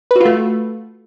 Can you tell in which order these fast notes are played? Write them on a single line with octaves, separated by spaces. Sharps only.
B4 F#4 F4 A3